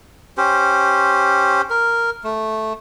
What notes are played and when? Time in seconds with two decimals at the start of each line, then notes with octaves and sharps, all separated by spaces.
0.37 C#4 G4 C5
1.70 A#4
2.24 A3